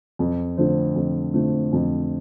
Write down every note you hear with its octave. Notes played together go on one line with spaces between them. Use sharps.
F2
D3 F3 A3 C4
F2
D3 F3 A3 C4
F2